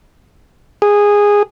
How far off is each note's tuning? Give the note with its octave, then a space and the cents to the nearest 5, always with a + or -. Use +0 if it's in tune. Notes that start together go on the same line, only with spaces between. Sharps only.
G#4 -15